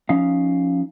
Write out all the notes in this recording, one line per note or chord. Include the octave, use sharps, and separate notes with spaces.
F3 C#4 D#4 F5